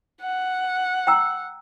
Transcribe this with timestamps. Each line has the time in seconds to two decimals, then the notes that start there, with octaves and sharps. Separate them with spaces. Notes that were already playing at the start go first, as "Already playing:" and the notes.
0.22 F#5
1.07 G5 A#5 E6